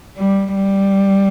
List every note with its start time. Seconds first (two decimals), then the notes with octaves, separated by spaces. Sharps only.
0.18 G3
0.55 G3